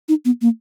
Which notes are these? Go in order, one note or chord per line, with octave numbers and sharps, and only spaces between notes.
D#4
B3
A#3